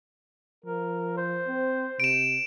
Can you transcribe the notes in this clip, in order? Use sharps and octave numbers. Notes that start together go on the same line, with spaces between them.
F3 A#4
C5
C4
C3 D7 E7